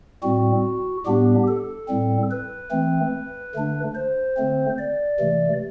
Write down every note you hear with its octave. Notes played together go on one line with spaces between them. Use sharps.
A2 G3 C4 F#4
A2 G3 B3 D4 G4
A4
A2 G3 C4
B4
E3 A3 C4
D3 A3 D4
C5
D3 A3 C4
D5
C3 E3 A3